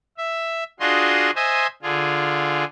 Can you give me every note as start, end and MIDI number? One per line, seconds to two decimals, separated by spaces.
0.17 0.64 76
0.80 1.31 62
0.80 1.31 65
0.80 1.31 66
0.80 1.31 68
0.80 1.31 75
0.80 1.31 84
1.35 1.67 72
1.35 1.67 75
1.35 1.67 76
1.35 1.67 80
1.82 2.64 50
1.82 2.64 65
1.82 2.64 68